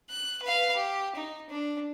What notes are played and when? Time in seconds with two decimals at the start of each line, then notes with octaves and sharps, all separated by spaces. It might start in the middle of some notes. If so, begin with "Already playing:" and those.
0.10 F#6
0.43 B4 F5
0.75 G4
1.16 D#4
1.50 D4